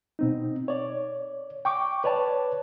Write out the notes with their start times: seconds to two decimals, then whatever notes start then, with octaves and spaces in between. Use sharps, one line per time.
0.19 B2 C4 D#4
0.68 C#5 D5
1.65 G5 C#6 D6
2.04 B4 C#5 D5 A5